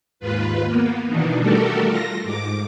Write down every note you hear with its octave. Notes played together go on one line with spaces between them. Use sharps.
D#2 G#2 F4 B4
A#3 B3
B2 D#3 E3 D4 D#4
G3 A3 F#4 G4 A4 A#4
F4 A#6
G#2 D6